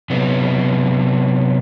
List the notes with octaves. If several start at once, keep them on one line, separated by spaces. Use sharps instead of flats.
C3 F#3 B3